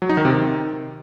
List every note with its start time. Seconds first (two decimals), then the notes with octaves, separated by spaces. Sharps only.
0.02 F#3
0.09 D#4
0.17 D#3
0.25 C3
0.32 D#3